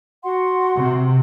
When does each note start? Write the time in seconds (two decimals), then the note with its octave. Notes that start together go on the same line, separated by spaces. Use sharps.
0.23 F#4 F#5 C6
0.75 C3